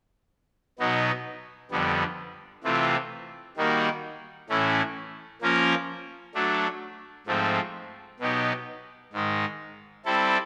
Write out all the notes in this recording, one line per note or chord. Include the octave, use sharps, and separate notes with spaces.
B2 F#3 B3 D#4
F2 D3 G3 B3
C3 E3 A3 C4 F4
D#3 G3 A#3 D#4 F#4
A2 E3 A3 C#4 E4
F3 A#3 C#4 F4 A#4
F#3 A3 D4
G#2 F3 A3 C4
B2 F#3 B3 D#4 G4
G#2 D#3 G#3
G3 C4 E4 A4